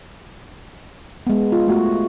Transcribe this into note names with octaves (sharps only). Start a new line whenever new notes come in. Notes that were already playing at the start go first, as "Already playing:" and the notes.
G#3 B3
F4
A3 F#4